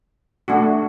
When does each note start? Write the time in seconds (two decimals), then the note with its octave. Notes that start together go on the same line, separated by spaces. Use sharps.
0.48 A3 D4 F#4